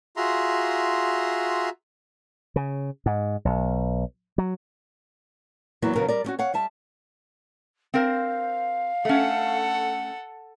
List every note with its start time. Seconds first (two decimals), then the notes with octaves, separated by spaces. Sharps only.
0.17 F4 F#4 G#4 E5 A#5 C6
2.56 C#3
3.06 G#2
3.45 B1
4.38 F#3
5.82 E2 E3 F#3 A#3 B3 E4
5.95 D#2 C#3 F#3 B3 F#4 A#4
6.08 G3 A#4 D5
6.24 G3 C#4 F#4
6.39 C#5 F5 F#5
6.54 G3 E5 A5
7.94 C4 A#4 C5 F5
9.05 A3 C#4 A4 F#5